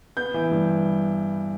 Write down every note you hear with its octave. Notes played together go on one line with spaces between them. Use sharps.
B3 G6
E3
G2